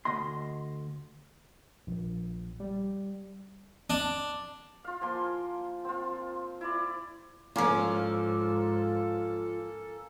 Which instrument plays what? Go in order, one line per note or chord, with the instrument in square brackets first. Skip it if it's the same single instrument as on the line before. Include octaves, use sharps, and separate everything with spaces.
[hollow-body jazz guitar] D2 D#5 C6
[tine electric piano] A#1
G3
[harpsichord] D4
[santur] F4 F5
F3 A#3 G#5 C6
C4 F4
E4 D5
[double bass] G#2 [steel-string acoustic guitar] F3 F4 [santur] A#3 C#4 [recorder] A4